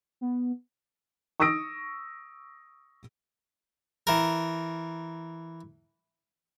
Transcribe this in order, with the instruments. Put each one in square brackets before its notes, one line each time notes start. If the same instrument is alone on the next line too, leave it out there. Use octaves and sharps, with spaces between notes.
[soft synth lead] B3
[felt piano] C#6 D#6 E6 A#6 D7
[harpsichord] E3 A#4